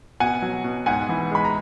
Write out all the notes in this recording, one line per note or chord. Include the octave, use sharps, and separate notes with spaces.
B2 F#5 G#5
F#3
B2
G#2 F#5 G#5
E3
G#3 B5
A#5